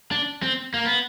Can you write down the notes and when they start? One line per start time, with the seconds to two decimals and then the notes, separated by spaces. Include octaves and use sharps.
0.11 D4
0.43 C4
0.74 A#3
0.86 B3